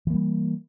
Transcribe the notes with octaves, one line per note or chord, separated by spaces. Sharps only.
E3 G3 A#3